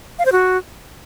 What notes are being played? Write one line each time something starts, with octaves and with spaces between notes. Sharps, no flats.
F5
C5
F#4